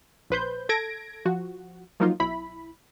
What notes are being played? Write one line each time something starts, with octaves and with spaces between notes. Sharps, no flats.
A#1 B4 C5 G6
A4 G#6 A#6 D7
F3 F#4
F3 F#3 A#3 D#4 F4
B1 E4 B5